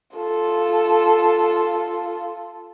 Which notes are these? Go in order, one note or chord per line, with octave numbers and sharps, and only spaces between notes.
F4 A4